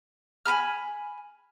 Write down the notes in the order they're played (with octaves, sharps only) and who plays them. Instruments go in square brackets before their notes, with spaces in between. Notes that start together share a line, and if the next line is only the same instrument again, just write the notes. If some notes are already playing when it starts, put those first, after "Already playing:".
[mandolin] G#5 A#5 B5 F6